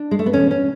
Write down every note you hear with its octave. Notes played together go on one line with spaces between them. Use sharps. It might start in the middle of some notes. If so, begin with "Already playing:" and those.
Already playing: D4
G#3
A3
B3
E2 B2 C#4
C#4